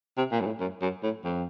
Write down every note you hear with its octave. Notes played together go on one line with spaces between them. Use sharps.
C3
A#2
F#2
A2
F#2
F#2
A2
F2